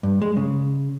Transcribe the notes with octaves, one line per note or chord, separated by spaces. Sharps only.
G2
G#3
C#3